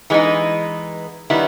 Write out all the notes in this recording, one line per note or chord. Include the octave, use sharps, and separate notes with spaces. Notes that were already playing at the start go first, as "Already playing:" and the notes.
E3 G#3 B3 D#4
D#3 G3 B3 E4